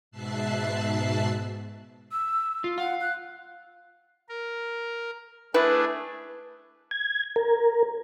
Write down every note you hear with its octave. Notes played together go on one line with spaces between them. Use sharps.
G#2 B2 E5 A5 F#6 C7
E6
F4
F5 F#5
F#6
A#4
A3 D4 E4 G#4 B4
G#6
A#4